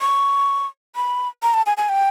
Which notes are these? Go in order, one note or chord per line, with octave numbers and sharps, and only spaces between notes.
C#6
B5
A#5
A5
G#5
G#5
G5